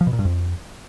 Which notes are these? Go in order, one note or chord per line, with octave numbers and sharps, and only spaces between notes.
F3
B2
A#2
G2
F2